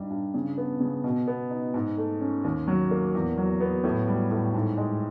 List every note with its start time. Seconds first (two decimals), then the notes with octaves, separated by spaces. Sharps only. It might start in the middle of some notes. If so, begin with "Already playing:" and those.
Already playing: G2 G3 D#4
0.10 G2
0.34 C#3
0.58 B3
0.80 C#3
1.04 B2
1.27 B3
1.51 D#4
1.74 G#2
1.98 A3
2.21 C#4
2.44 D#2
2.68 F#3
2.91 A#3
3.15 E2
3.38 F#3
3.61 B3
3.84 A2
4.08 G3
4.31 A2
4.54 G#2
4.77 G#3